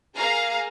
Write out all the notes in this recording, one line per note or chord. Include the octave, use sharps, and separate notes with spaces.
A#3 G#4 F5 A#5